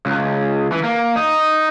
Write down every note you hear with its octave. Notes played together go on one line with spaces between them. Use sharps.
C#2
E3
A#3
D#4